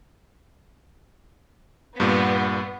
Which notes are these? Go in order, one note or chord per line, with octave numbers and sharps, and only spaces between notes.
G2 A#2 B3